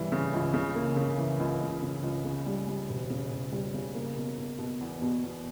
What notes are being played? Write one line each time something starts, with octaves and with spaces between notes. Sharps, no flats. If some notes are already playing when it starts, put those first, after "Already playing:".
Already playing: C#3 E3 G3
C#3
C#2
C#3
A#3
C#3
E3
C#2
C#2
C#3
C#2
C#3
G3
G3
E1
C#3
E1
G3
C#3
A#3
B2
B2
B2
E2
B2
E2